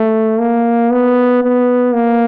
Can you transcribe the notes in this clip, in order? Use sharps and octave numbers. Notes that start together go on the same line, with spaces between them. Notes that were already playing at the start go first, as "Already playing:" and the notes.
Already playing: A3
A#3
B3
B3
A#3